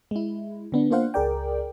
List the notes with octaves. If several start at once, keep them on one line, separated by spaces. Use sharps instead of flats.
G#3 E4
D3 B3 D4
A#3 D4 F4 C5 F5 F#5
C#2 G#4 A#4 D5 G5